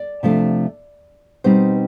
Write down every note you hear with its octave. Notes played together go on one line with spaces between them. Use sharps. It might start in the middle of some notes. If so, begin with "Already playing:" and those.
Already playing: D5
C3 F3 A3 D4
B2 G3 C4 D#4 C5